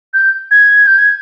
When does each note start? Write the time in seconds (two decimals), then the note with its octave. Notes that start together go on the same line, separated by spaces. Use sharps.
0.14 G6
0.51 G#6
0.87 G6
0.99 G#6